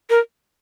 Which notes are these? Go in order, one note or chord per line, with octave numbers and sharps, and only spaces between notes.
A#4